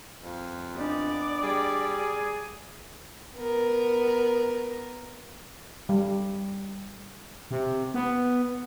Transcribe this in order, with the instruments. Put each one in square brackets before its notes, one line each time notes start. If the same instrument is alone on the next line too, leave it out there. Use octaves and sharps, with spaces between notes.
[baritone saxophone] F2
[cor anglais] B3 [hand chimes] D4 D#5 [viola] D5
[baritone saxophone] G3 [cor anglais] G#4
[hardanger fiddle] B3 A#4
[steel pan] G3
[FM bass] C3
B3